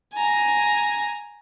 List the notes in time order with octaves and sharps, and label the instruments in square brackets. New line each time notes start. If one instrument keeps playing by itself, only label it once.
[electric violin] G#5 A#5